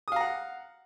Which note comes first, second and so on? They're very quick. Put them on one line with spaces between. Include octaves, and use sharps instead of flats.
D#6 F5 A#5 F#5